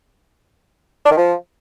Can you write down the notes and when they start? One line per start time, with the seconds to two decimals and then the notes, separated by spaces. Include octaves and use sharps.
1.05 D4
1.11 D#3
1.17 F3